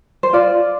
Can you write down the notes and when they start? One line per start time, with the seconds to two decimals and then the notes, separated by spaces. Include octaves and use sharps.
0.23 C5
0.33 F4 D5